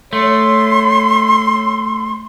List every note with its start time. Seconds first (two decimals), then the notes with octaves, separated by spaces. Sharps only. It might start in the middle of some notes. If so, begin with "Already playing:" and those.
0.13 A3 C#5 C6